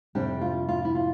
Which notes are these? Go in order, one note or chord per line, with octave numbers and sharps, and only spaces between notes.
F2 C3 G3 D4 G4
F4
F4
E4
F4